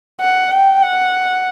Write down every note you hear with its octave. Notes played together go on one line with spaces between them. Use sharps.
F#5
G5
F#5